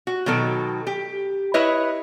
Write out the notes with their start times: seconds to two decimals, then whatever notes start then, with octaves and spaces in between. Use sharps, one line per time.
0.07 F#4
0.26 B2 D#3 F#3 A4
0.87 G4
1.54 E4 B4 C#5 D#5